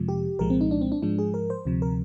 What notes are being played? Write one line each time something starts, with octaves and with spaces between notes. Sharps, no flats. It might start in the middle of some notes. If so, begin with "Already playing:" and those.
Already playing: F2 C3 F3 G#3
G4
C2 A#2 F3 G#3 A#4
C4
D#4
D4
C4
D4
G#2 F3 G#3 D4
G#4
A#4
C5
D2 C3 F3
A#4